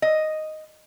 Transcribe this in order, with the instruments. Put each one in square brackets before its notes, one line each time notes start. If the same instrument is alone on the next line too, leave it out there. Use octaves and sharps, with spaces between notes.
[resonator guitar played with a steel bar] D#5